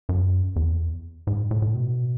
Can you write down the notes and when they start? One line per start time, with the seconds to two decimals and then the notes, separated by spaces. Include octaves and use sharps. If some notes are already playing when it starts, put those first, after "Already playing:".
0.09 F#2
0.56 E2
1.27 G#2
1.51 A2
1.62 A2
1.75 B2